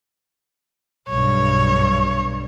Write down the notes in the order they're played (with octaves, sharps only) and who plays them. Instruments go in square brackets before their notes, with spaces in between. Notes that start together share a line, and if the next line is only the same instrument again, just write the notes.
[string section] B1 G2 [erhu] C#5